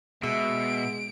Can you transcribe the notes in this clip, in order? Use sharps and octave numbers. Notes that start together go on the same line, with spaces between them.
B2 G#3 E5 D7